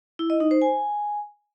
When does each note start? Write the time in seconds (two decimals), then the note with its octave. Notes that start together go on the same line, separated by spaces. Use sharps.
0.19 E4
0.30 D#5
0.40 D#4
0.51 C5
0.62 G#5